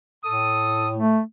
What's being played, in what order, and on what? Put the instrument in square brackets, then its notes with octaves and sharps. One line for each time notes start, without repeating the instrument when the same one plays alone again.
[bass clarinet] A2 [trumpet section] A4 D#6
[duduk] A3